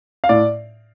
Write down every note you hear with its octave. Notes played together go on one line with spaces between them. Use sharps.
F5
A2 D5